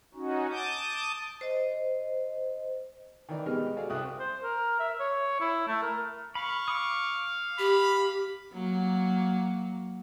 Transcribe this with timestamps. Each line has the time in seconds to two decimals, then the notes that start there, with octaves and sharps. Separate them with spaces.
0.14 C#4 D#4 F#4
0.51 A5 D6 D#6 G6
1.41 C5 D#5
3.29 D#3 E3 D5
3.46 B2 G3 G#3 B3 D#5 F6
3.77 F#4 G#4 A4 D5 F5
3.90 C2 E5 D#6 F#6
4.20 C5
4.43 A#4
4.80 E5
5.00 C#5
5.41 E4
5.67 A3
5.83 A#4
6.35 F5 B5 C#6
6.68 D6 D#6
7.59 G4 B5
8.53 F#3 A#3